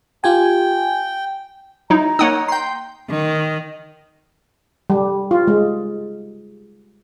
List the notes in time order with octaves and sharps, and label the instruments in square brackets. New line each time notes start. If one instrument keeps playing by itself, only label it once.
[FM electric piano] F4 G4 G#5 [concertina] G5
[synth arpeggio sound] F#3 D#4 E4 [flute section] A#5
[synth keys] A#3 D#4 [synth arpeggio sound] C#5 F#5 D#6
[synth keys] G5 C6
[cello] D#3
[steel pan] G3
F4
G#3